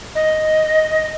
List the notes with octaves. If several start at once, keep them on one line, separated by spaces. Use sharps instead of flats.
D#5